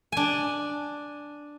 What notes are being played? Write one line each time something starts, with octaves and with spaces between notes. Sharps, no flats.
D4 G#5